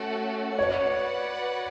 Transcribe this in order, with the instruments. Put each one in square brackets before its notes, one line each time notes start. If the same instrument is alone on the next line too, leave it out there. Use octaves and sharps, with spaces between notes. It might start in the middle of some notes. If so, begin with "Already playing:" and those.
Already playing: [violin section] A3 C#4 F#4 A4
[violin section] F#4 B4 D5 F#5 [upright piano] C#5